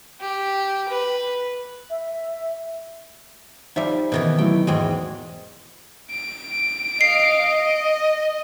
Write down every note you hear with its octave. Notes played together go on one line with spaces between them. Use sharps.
G4
B4
E5
F3 G3 D#4 E5
B2 D#3 E3
F#3 A3 E4 G5
E2 G#2 G#3 F#4 G5
D7
D#5 F5 C7
D#5